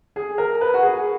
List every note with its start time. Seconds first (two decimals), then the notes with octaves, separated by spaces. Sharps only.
0.16 G#4
0.38 A#4
0.61 B4
0.74 F#4
0.83 G#4